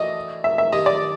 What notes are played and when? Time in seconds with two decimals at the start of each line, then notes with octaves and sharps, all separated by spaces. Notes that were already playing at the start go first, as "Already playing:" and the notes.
Already playing: E3 A3 D4 F#4 D#5
0.44 E5
0.58 E5
0.72 G2 D#3 G3 D#5
0.86 D5